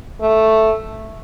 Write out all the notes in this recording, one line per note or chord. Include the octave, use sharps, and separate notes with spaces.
A3